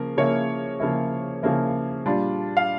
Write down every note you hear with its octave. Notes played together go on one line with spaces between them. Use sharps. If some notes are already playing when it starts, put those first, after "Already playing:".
Already playing: C#3 F3 A#3 A#4
C#3 F3 A#3 E4 C#5
C#3 F3 A#3 E4
C#3 F3 A#3 E4
A#2 G3 D4 F4
F5